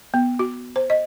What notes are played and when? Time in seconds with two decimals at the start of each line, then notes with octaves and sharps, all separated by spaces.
0.14 B3
0.39 F#4
0.76 C5
0.90 D#5